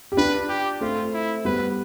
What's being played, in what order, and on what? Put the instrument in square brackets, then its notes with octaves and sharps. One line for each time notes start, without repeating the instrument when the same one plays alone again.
[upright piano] G4
[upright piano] D4 F4 [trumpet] B4
[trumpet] G4
[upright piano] A3 C4 [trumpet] F4
[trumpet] E4
[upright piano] G3 B3 [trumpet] B4